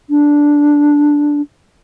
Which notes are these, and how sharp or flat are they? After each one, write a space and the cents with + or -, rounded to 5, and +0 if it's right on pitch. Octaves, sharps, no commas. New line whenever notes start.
D4 -5